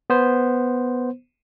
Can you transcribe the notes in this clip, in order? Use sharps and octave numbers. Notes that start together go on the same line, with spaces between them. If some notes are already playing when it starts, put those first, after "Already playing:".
B3 C5